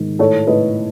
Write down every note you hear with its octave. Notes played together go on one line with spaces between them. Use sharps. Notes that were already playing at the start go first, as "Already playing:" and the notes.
Already playing: G#2 D#3
A2 A4 C#5
A2 B4 D#5